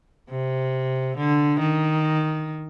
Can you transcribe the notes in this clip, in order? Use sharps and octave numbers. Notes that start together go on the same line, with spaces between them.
C3
D3
D#3